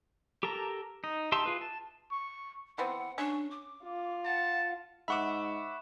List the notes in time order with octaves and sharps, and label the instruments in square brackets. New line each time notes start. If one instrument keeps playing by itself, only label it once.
[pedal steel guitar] G4 A4 A#4 A5 A#5
D#4
D#4 G4 E5 A5 C6
F4 G#4 B4
A5
[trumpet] C#6
[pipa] E3 B3 C4 [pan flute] F#5
[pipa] C#4 C#5 C#6 [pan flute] D4
[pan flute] D6
[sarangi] F4
[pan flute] F#5 [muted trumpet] A5
[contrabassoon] G#2 [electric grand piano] E5 F#5 D6 [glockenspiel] B5 C#6 E7